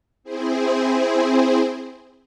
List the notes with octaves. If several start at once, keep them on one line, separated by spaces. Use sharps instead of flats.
C4 E4 G#4 C5